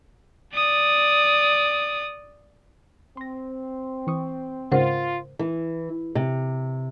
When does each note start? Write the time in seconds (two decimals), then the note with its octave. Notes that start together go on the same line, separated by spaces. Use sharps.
0.54 D5 D#6
3.17 C4 C6 A#6
4.07 E3 C#6 D#6
4.72 G#2 C#3 F4 A#4 C5 F#5
5.39 E3
6.15 C3